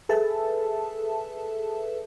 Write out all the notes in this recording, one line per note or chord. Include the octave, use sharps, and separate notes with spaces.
G#4 A4 B4 E5 A5